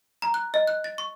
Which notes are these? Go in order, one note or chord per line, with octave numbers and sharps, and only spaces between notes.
A#5
F#6
D#5
F#6
A6
C#6